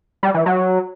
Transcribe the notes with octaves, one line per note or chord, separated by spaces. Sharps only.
G3
E3
F#3